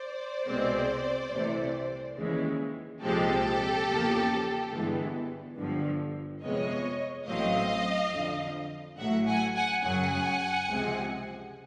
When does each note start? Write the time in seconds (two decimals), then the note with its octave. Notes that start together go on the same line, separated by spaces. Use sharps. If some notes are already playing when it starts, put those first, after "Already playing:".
Already playing: C5 D5
0.47 C2 B2 G#3 C4
1.32 C2 C3 E3 A3
2.18 D#2 C#3 E3 G#3
3.02 C2 A#2 F3 G#3 C4 G4 A4
3.87 E2 C#3 F3 A#3
4.73 G1 G2 E3 G#3 B3
5.57 G1 G2 D3 F3
6.42 F2 C3 F3 G#3 B3 C#5 D#5
7.27 A1 A2 F#3 A3 C4 D#5 F5
8.13 F2 D3 F3
8.98 A1 A2 F#3 A3 E5 F#5
9.26 F#5 G#5
9.54 F#5 G#5
9.83 F#2 C#3 F#3 F#5 G#5
10.68 C#2 C3 F3 G#3 C4